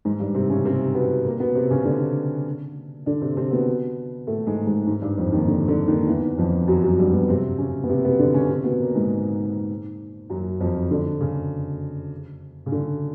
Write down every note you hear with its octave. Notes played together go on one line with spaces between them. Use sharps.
G#2 G#3
G2 G3
C3 C4
C#3 C#4
C3 C4
B2 B3
A#2 A#3
B2 B3
C3 C4
C#3 C#4
D3 D4
D3 D4
C3 C4
C3 C4
B2 B3
A2 A3
G#2 G#3
G#2 G#3
G#2 G#3
G2 G3
F2 F3
D#2 D#3
D3
D3
D#2 D#3
E2 E3
F2 F3
F#2 F#3
F#2 F#3
G2 G3
B2 B3
C3 C4
C#3 C#4
B3
C3 C4
B2 B3
D3 D4
C#3 C#4
C3 C4
B2 B3
A#2 A#3
G#2 G#3
F#2 F#3
F2 F3
D3
C#3
C#3
D3